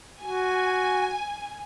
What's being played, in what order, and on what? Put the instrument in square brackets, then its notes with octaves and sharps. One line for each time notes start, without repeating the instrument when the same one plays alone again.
[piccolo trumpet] F#4 [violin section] G#5